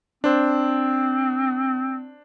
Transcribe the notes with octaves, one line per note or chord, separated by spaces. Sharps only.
C4 D4 C5